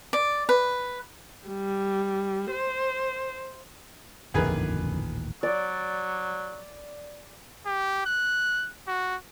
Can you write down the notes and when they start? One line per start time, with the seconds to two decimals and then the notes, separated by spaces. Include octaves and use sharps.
0.13 D5
0.49 B4
1.48 G3
2.52 C5
4.34 D#1 A1 F2 D3 D#3 G#4 B4
5.43 F#3 D5
7.66 G4
8.06 F#6
8.88 F#4